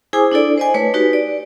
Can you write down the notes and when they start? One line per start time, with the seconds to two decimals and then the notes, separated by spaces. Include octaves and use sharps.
0.13 E4 G#4 C5 G#5 D6 D#6
0.32 D4 E4 A4 D5
0.57 C5 D#5 G#5
0.74 A3 B4 C#5
0.94 D#4 F#4 G4 B4
1.13 D5